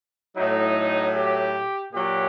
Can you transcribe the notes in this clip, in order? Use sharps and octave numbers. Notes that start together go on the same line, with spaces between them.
A2 F#3 D#4
G4
A#2 F#3 G4